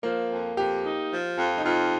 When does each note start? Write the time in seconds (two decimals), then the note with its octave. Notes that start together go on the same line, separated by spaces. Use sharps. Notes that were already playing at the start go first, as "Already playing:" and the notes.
0.03 F3 A#3
0.31 F2
0.57 F2 G4
0.84 D#4
1.12 F3
1.38 F2
1.58 D#4
1.65 F2 F4